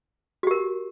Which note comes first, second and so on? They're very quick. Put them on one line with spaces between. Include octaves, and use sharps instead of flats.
F#4 G4 A#4